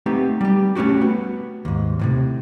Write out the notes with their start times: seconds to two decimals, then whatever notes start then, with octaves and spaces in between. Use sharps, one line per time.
0.06 A3 B3 C4 D#4 G4
0.41 G3 G4
0.75 A3 C#4 D4 F#4 G4
1.01 B3
1.65 D#2 G#2
1.99 D#2 A2 C3